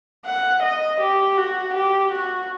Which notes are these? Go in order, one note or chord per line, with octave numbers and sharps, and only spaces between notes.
F#5
D#5
G4
F#4
G4
F#4